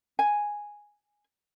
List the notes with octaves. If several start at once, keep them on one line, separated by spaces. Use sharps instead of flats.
G#5